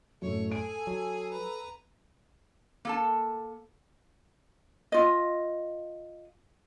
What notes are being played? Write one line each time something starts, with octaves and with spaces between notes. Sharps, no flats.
F#2 A2 A4 C#5
G#4 G#5 D7
F#3
B4 A#5
A#3 A4 A5
F4 D#5